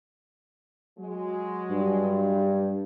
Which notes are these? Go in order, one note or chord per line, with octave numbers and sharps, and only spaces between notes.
F#3 G#3
G2